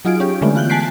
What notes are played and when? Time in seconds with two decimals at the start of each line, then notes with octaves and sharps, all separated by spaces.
0.05 F#3 D#4 F4 G#4 D7
0.20 C#4 G4
0.41 D3 E3 G#3 A3 B3 C#4
0.55 F4 F#6 G6
0.70 G#5 A5 F#6 B6 C7 D7